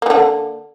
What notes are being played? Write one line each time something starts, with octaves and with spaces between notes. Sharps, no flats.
D3 E3 A#3